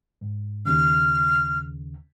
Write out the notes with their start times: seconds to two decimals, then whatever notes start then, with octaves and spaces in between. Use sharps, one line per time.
0.21 G#2
0.65 D#2 C#3 F6